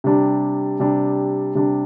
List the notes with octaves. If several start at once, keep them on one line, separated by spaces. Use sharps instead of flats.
C3 G3 D4
C3 G3 D4
C3 G3 D4